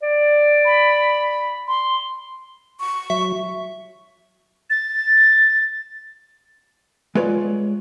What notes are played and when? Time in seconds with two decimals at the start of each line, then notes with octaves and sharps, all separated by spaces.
0.03 D5
0.65 B5
1.68 C6
2.80 C#6
3.10 F#3 E5
4.70 A6
7.15 G#3 F4 B4 C#5 D5